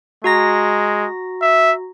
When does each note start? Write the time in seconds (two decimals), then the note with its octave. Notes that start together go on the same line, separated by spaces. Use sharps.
0.24 G#3 F#4 A#5 A#6
1.42 E5